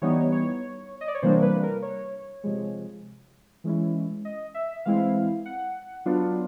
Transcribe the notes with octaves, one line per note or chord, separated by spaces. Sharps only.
E3 G3 B3 D#4 C#5
C#5
D#5
D5
C#5
C3 E3 G3 A#3 D4 C5
B4
A#4
C#5
C3 F3 G#3
E3 G#3 C#4 E4
D#5
E5
E3 G#3 C4 E4 F5
F#5
F#3 B3 D4 F4